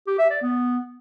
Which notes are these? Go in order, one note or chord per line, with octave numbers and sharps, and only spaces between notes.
G4
E5
D5
B3